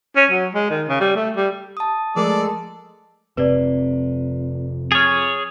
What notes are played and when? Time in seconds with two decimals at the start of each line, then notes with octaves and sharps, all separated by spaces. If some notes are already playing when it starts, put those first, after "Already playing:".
0.16 C#4
0.30 F#3
0.54 G#3
0.70 D#3
0.88 C#3
1.00 G3
1.16 A3
1.36 G3
1.77 A5 D#6
2.16 F3 G#3 A3 A4 A#4 D5
3.37 F1 F2 C3 B4 D5
4.92 G#4 C#5 F6 G#6 A6